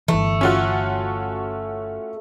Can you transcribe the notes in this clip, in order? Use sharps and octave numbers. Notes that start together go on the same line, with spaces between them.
G1 E3 A3
C#4 F4 F#4